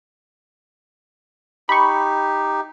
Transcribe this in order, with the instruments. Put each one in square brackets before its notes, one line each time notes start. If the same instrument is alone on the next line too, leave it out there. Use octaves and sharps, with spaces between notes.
[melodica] D#4 G4 [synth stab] B5 C#6